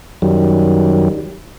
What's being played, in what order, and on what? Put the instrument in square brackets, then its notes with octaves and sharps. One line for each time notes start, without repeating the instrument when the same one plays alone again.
[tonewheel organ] F#2 D#3 F#3 G3